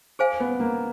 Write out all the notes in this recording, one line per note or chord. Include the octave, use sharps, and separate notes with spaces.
G#4 C5 F5 G#5
B3
A#3